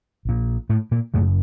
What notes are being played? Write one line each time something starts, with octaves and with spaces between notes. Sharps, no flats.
A#1 A#2
A2 A3
A#2 A#3
F#1 F#2 A2 C#3 A3